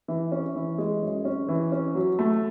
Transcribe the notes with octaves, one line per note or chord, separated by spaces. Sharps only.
E3
C#4
E3
G#3
F#2
C#4
E3
C#4
F#3
A3